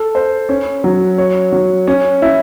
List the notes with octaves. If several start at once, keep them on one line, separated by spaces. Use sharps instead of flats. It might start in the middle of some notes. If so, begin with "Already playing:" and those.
Already playing: A4
C5
C#4
F#3
C#5
F#3
C#4
E4